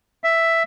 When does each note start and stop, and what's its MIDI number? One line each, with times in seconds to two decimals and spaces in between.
0.24 0.63 76